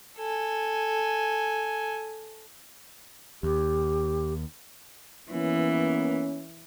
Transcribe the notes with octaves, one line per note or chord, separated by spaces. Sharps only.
A4 G#5
D#2 G4
E3 A#3 B3 C#4